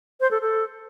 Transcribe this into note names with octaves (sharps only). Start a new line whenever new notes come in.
C5
A4
A4